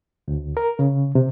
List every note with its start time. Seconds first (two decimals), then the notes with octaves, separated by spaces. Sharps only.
0.28 D2
0.57 A#4
0.79 C#3
1.15 C3